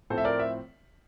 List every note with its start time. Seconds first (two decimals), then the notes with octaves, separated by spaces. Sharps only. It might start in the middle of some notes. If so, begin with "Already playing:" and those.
0.10 A2 F3 C4 A4 C5
0.18 E5
0.25 A#4 D5
0.39 E5